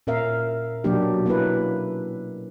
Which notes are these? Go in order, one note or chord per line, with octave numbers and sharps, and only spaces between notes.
A#2 C#4 A#4 E5 F5
B2 F#3 A#3 D4 D#4 G4
A#3 C#4 E4 B4